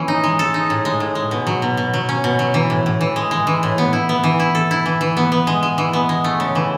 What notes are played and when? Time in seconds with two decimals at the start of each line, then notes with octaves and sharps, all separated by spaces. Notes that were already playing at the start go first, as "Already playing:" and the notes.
Already playing: E3 C#4
0.08 D#4
0.24 G#3
0.39 A4
0.54 D#4
0.70 A2
0.85 G#3
1.00 A2
1.15 G#3
1.31 B2
1.47 F#3
1.62 B2
1.77 B2
1.94 F#3
2.09 C#4
2.24 B2
2.39 F#3
2.54 E3
2.70 A2
2.86 A2
3.01 E3
3.16 G#3
3.31 G#3
3.47 E3
3.63 A2
3.78 B3
3.93 E4
4.09 B3
4.24 E3
4.40 E4
4.55 A4
4.71 E4
4.86 E3
5.01 E3
5.17 B3
5.32 B3
5.47 G#3
5.63 G#3
5.78 E3
5.93 B3
6.09 G#3
6.24 A3
6.40 C#3
6.55 E3